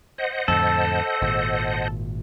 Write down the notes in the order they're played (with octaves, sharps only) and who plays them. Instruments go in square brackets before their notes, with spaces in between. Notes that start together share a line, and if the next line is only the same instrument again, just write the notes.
[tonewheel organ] C5 D#5 F#5
[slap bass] F2 A2 D3 [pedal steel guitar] A4
[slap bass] G#1 A#2